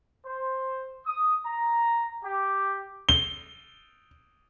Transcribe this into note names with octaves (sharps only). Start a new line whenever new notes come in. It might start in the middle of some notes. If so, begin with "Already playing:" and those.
C5
D#6
A#5
G4
G7